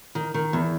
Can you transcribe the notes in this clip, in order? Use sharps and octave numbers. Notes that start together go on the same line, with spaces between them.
D#3
D#3
E2